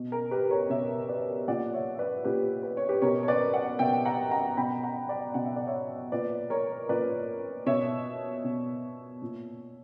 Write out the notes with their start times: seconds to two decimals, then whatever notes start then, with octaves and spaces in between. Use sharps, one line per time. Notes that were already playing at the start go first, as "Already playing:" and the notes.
Already playing: B2
0.12 A#4
0.31 G4 B4
0.51 A#4 C#5
0.70 B2 C#5 E5
1.09 B4 D5
1.48 A#2 D5 F#5
1.73 C#5 E5
1.94 E5
1.99 B4 D5
2.24 A#2 G4 B4
2.63 B4
2.77 C#5
2.89 G4 B4
3.02 B2 A#4 C#5
3.23 C#5
3.28 B4 D5
3.54 D5 F#5
3.79 B2 E5 G5
4.05 F#5 A#5
4.31 F#5 A#5
4.57 B2 G5 B5
4.83 F#5 A#5
5.09 D5 F#5
5.34 B2 F#5
5.45 E5
5.56 D5
5.67 C#5 E5
6.12 A#2 B4 D5
6.50 A#4 C#5
6.89 A#2 B4 D5
7.66 B2 C#5 E5
8.44 B2
9.22 A#2